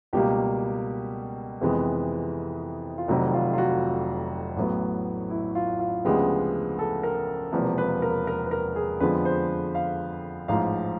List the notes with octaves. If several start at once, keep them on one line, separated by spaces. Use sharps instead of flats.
C#2 B2 G3 A#3 G4
F2 C3 E3 G#3 B3
F4
F1 F2 C3 D#3 F#3 F#4
F4
F4
F#4
A1 A2 F#3 B3
E4
F4
F4
D2 C#3 F3 G#3 B3 G4
A4
A#4
E1 E2 C3 F3 A#3 B4
B4
A#4
A#4
B4
A#4
G#4
F2 D3 F3 G#3 B3 B4
C5
F5
A1 G#2 F3 F5